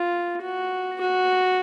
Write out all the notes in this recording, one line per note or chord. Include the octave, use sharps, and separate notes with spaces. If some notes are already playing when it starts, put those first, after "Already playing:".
Already playing: F4
F#4
F#4